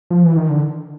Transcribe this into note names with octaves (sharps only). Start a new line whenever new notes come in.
F3
E3
D#3
D3